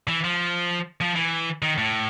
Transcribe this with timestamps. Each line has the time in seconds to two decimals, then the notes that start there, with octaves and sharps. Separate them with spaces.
0.08 E3
0.24 F3
1.01 F3
1.16 E3
1.62 D#3
1.78 A2